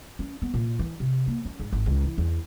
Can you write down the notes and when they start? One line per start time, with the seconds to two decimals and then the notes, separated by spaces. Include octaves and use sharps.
0.19 C#4
0.42 B3
0.54 A#2
0.79 E3
1.00 C3
1.27 A#3
1.45 C#4
1.60 G#2
1.72 G#1
1.86 C#2
2.04 E3
2.18 E2